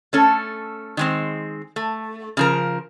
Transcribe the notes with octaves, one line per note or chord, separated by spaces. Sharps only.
A3 C#4 A4
D#3 G#3 C4
A3
C#3 F3 A#4